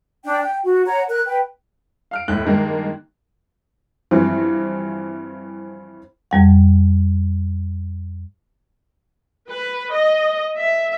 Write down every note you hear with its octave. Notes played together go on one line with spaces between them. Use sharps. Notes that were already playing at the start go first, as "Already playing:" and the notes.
D4 D5 G5
G5
F#4
C#5 F#5 A#5
A#4 F#6
B4 G5
F5 F6 D7
D#2 A2 F#6
G2 D#3 G#3 A#3
G2 E3 F3 C4
F2 G3 F#5
B4
D#5
E5